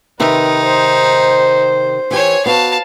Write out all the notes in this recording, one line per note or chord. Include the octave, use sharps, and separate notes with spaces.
C3 D#3 D#4 B4 E5
C5
E3 G4 C#5 G#5
B3 F#4 F5 A5